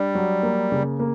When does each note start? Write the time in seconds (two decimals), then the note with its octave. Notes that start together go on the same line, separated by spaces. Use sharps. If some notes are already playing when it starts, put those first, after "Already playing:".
Already playing: G3 D4
0.15 F#3
0.43 A#3
0.72 C#3
0.99 A#3